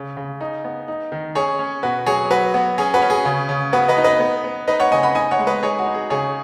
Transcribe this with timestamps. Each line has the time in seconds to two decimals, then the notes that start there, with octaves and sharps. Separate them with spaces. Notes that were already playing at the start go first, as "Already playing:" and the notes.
Already playing: C#3
0.17 C#3
0.41 D#4
0.64 B3
0.88 D#4
1.12 D#3
1.35 C#4 G#4 C#5
1.59 C#4
1.83 B2 F#4 B4
2.06 F#3 G#4 C#5
2.30 F#3 F#4 B4
2.54 B3 F#4
2.78 C#4 G#4
2.94 F#4 B4
3.02 C#4
3.10 G#4
3.25 C#3
3.49 C#3
3.73 B3 F#4 B4
3.88 B4 D#5
3.97 D#4
4.04 B4 D#5
4.20 B3
4.44 B3
4.68 D#4 B4 D#5
4.80 C#5 F#5
4.92 C#3 D#5 G#5
5.03 F#5 B5
5.15 D#4 D#5 G#5
5.31 C#5 F#5
5.39 G#3
5.47 B4 D#5
5.63 D#4 G#4 C#5
5.79 F#4
5.86 D#4
5.94 G#4
6.10 C#3 G#4 C#5